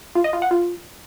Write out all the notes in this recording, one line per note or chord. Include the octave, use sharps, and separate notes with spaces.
F4
D#5
F4
F#5
F4